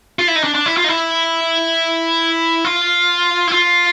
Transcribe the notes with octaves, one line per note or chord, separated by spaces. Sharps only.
F4
E4
D#4
D4
D4
E4
F4
D#4
E4
F4
E4
F4